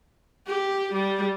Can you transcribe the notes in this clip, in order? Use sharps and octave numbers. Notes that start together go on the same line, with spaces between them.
G4
G3